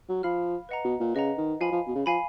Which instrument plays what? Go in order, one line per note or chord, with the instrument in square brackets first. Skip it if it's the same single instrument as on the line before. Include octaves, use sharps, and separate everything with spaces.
[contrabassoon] F#3
[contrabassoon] F3 [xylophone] F5 B5 F6
[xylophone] B4 D#5 F#5 A#5
[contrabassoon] B2
A#2
[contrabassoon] C#3 [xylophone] B4 D#5 F#5 A#5
[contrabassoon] D#3
[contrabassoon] F3 [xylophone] F5 G#5 B5
[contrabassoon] F3
B2
C#3
[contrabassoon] F3 [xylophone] F5 G#5 B5